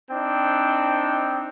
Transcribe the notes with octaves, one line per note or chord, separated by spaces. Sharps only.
C4 D4 D#4 G5